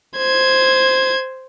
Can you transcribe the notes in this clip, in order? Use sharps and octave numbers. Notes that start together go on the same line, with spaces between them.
C5 G#6